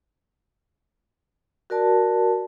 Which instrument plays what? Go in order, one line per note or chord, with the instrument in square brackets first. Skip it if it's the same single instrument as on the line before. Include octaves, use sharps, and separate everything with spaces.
[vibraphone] F#4 A#4 D5 A5